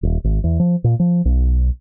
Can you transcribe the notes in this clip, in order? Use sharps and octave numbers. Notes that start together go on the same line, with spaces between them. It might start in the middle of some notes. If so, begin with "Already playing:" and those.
D#1
G#1
E2
F3
A#2
F3
B1